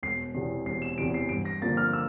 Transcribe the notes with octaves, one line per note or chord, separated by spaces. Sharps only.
E1 C7
E2 C3 E3
E1 C7
E7
E2 C3 E3 D7
C7
G2 D7
A#6
D3 F3 A#3 A6
F6
E6